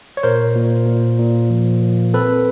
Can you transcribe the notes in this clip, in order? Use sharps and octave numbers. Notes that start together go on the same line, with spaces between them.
C#5
A#2 A#4 C5
A#2
A#2
A#2
F3
F3
C4 A4 B4